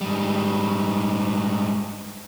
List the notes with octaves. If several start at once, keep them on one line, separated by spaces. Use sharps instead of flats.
G#2 G3